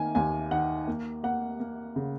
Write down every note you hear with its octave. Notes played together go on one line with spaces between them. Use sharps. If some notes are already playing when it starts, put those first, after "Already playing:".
Already playing: D#3 A#3 G#5
D#2 G#5
D#3 F#5
A#3
A#3 F#5
A#3
C#3